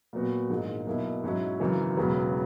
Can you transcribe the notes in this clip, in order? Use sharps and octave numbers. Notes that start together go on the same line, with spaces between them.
A#2 F#3 B3 F#4
A#1 G#2 D#3 G#3
B1 B2 A#3 E4
G#2 F#3 C#4 E4
G#1 F#2 C#3 E3
E1 E2 C#3 F#3 B3